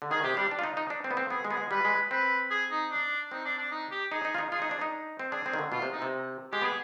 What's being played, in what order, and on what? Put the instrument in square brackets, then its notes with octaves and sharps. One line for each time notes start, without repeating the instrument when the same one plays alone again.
[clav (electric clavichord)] D3
[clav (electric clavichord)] D#3 [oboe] G#4
[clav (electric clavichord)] C3 [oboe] G4
[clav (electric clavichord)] G3 [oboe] D4
[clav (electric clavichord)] D4
F4
D#4
D#4
D4
C4
B3
C4
[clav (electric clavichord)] B3 [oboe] G#4
[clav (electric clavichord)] G#3
[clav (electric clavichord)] B3 [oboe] G#4
[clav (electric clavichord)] G#3
[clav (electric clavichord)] G3 [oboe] B4
[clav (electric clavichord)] G#3
[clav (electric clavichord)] C4 [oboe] B4
[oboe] G#4
D#4
D4
[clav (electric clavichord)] C4 [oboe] D#4
[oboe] D4
D4
D#4
G4
[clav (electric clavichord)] D#4 [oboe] G#4
[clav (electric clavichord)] D#4
F4
D#4
[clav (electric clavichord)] F4 [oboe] G#4
[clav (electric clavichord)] D#4
D4
D#4
C4
[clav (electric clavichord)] D4 [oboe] G#4
[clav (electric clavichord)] C4
D#3
D3
[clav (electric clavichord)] B2 [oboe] F4
[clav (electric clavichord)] C3
[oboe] D#4
[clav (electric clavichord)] C3
[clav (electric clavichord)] G#3 [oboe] G4
[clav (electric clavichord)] B3 [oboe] G#4